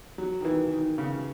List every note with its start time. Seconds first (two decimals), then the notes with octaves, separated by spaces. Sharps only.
0.18 F#3
0.41 D#3
0.45 E3
0.72 D#3
0.98 C#3